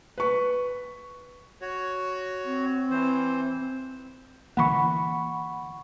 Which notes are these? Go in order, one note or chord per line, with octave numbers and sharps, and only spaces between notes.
B4 C#6
F#4 C#5
C4
E3 C5
D3 E3 A#3 F#5 B5 C#6